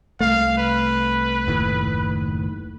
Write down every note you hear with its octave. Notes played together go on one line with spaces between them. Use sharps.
C2 A3 F5
B4
F#1 D#2 A2